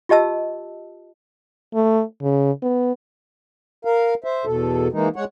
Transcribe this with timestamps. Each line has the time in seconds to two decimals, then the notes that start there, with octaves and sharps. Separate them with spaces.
0.09 F4 G4 D#5 A5 E6
1.74 A3
2.22 C#3
2.62 B3
3.85 A#4 F5
4.24 C5 E5
4.45 E2 B2 A4
4.92 E3 G#3 A#3 D#4
5.16 G#3 C#5 F#5